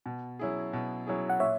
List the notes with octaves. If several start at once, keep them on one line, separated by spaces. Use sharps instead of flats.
B2
F#3 C#4 E4 G#4
B2
F#3 C#4 E4 G#4
F#5
A#2 C#5 E5